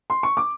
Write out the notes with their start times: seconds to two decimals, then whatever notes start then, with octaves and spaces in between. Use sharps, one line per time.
0.10 C6
0.23 C#6
0.37 D6